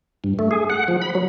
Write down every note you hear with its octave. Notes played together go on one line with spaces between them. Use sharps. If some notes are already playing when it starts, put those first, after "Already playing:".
G2
A3
G#4
F#5
F3
B5
F#3